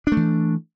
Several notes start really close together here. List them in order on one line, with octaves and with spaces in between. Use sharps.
D4 A3 E3